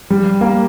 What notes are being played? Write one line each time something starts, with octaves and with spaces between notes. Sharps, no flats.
G3
A#3